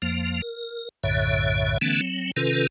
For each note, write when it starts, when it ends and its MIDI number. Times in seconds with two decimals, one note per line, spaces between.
0.02 0.41 41
0.02 0.41 53
0.02 0.41 58
0.42 0.89 70
1.03 1.78 35
1.03 1.78 42
1.03 1.78 45
1.03 1.78 50
1.03 1.78 73
1.03 1.78 76
1.81 2.01 50
1.81 2.01 52
1.81 2.01 57
1.81 2.01 59
1.81 2.01 61
2.01 2.31 54
2.01 2.31 60
2.36 2.67 48
2.36 2.67 51
2.36 2.67 61
2.36 2.67 65
2.36 2.67 69
2.36 2.67 71